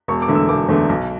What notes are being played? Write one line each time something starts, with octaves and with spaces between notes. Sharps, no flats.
E1 C#6
D6
E2 D3 A3
E6
E1 D6
E2 D3 A3
B1